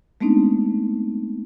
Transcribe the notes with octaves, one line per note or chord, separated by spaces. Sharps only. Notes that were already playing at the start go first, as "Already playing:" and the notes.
G#3 A3 B3 C4 D4 D#4